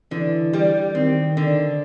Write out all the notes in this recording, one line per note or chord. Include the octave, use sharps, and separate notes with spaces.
D3 E3
G3
D#3 C4
D3